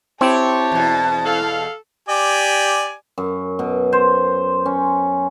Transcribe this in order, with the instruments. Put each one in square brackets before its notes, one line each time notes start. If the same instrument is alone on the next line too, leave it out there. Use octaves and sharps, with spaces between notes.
[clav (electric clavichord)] C4 [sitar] E4 [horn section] G4 C#5 [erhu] A5
[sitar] E2 B2
[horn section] A4 F5
[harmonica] G4 D5 G#5
[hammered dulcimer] F#2
B2
C5
C#4